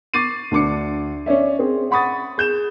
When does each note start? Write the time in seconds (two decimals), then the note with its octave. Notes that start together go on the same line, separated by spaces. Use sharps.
0.14 C#6 D6 A6 C7 D#7
0.51 D2 D4 D6 C#7
1.26 C#4 C#5 D5 E5
1.59 C4 G#4
1.91 F#5 B5 C#6 D#6 A6
2.38 G#4 G6 E7